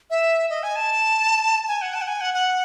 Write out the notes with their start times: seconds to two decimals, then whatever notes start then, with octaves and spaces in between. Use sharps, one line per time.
0.10 E5
0.50 D#5
0.63 G#5
0.76 A5
1.68 G#5
1.82 F#5
1.94 A5
2.01 F#5
2.08 G#5
2.21 F#5
2.34 F#5